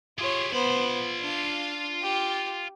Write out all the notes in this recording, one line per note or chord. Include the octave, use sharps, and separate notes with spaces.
F4 G4 G#4 C#5
B3 F4 C5 B5
D4 F5
G4